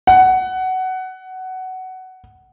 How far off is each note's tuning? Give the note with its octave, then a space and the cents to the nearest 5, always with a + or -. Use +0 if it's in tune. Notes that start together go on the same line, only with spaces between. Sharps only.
F#5 +15